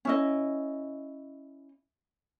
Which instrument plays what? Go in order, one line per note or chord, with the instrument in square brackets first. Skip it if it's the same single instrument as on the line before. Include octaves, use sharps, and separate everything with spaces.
[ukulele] C#4 E4 D#5